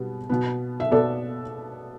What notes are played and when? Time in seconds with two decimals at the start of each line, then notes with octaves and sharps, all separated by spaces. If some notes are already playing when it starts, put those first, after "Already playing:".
Already playing: B2 G3 B3
0.30 B2 B3
0.80 E5
0.91 B2 B3 A4 D5